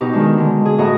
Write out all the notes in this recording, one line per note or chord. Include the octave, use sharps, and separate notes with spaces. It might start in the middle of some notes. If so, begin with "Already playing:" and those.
B2 D#4 G4
D#3 G#3 D4
D3 G#3
G#4
A2 F#4 D#5 A#5